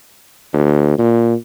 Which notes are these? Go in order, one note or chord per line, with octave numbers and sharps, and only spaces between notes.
D2
A#2